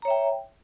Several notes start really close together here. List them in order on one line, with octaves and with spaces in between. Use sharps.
A#5 C#5 E5 G5